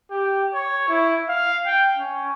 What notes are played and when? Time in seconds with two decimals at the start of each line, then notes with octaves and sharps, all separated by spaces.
0.11 G4
0.54 C#5
0.89 E4
1.29 F5
1.66 G5
1.97 C#4